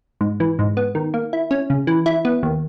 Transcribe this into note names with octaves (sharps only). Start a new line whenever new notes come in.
G#2
E3
G#2
B3
D#3
A#3
E4
C#4
C#3
E3
E4
B3
D#2